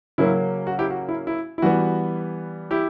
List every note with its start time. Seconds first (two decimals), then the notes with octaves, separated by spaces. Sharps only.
0.18 C#3 F#3 A#3 C#4 E4
0.67 F#4
0.79 E4 G4
0.90 F#4
1.09 E4
1.27 E4
1.58 E4
1.62 E3 G3 B3 F#4
2.71 E4 G4